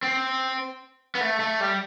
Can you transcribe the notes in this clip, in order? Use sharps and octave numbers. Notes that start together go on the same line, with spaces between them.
C4
B3
A3
A3
G3